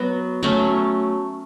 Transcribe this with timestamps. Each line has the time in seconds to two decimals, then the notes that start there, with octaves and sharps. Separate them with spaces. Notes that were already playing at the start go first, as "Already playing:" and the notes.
Already playing: F#3 B3 F#4
0.43 F#3 A3 C#4